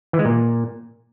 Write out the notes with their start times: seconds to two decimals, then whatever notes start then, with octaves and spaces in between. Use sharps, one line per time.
0.13 E3
0.19 G#3
0.25 A#2